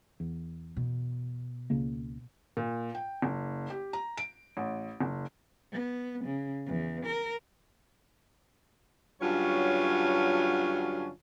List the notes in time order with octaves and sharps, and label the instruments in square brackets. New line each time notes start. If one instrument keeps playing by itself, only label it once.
[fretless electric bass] E2
[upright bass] B2
[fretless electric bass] C#2 C#3 A#3
[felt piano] A#2
G5
F#1
G4
A#5
D7
A1
F#1
[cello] B3
C#3
E2
A#4
[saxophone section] G2 D3 F#3 C#4 F4 C#5